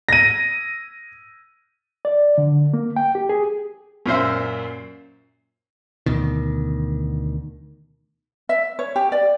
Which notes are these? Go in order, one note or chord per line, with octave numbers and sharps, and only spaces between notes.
A#6 D#7
D5
D3
A#3
G5
G4
G#4
F#2 A#2 C5 E5
D2 B2 D#3
E5
C#5
G4
D5